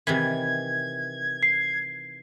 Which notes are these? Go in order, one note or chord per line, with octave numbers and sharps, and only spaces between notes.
C3 D#3 E3 G#6
C7